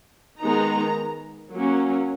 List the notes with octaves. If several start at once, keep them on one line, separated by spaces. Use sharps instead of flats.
D#3 G#3 B3 D#4 A#5
F#3 A#3 C#4